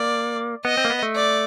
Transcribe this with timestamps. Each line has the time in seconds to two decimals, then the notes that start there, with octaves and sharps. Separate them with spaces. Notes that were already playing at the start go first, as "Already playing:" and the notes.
Already playing: A#3 D5
0.65 B3 D#5
0.77 C4
0.85 A#3
0.90 B3
1.03 A3
1.15 D5